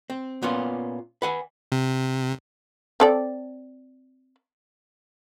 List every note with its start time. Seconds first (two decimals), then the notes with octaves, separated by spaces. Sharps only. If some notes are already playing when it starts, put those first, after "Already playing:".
0.10 C4
0.42 A#2 B3 C#4 F4
1.22 B4 F#5 G#5
1.72 C3
3.00 C4 A4 D5